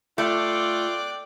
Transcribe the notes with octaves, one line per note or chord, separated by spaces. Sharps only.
A3 F4 D5 G5 D6 F#6